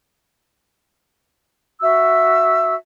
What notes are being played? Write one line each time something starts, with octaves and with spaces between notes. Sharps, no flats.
F#4 E5 E6